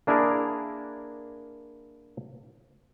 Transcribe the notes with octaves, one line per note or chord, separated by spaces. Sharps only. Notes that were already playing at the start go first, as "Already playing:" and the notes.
A#3 D4 E4 G#4 A#4